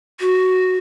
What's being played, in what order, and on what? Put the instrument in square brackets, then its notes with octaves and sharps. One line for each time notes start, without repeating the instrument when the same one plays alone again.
[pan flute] F#4